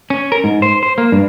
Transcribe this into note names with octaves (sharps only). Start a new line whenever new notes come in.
C#4
A#4
G#2
C5
C5
A#3
G2